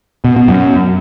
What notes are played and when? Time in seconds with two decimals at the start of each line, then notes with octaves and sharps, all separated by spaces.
0.25 B2
0.36 B2
0.48 F#2